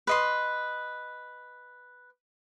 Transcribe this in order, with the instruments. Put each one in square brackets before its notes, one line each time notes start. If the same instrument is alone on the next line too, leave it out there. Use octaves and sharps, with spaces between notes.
[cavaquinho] B4 D#5 C6